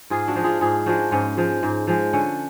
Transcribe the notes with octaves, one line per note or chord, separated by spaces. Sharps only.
G#2 F4 G#4
D4 F#4
F3 G#3
F4 G#4
G#2 F4 G#4
F3 G#3 D4 F#4
G#2 C#4 F4
F3 G#3
G#2
F3 G#3
D3 C#4